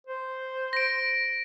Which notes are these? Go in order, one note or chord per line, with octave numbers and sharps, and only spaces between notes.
C5
A#6 D7